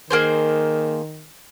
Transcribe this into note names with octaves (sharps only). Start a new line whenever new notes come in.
D#3 A#3 G#4 C5